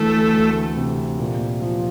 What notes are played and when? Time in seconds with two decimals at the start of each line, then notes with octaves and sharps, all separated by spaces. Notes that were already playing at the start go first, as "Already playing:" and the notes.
Already playing: D2 E3 A3
0.33 D2
0.76 C3
1.19 A#2
1.61 F3